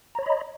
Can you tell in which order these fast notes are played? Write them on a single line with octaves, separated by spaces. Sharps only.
A#5 C#5 B5 D#5